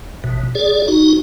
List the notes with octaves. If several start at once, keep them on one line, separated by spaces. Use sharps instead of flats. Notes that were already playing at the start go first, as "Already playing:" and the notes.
A1 B2
G#4 D5
D#4 F#4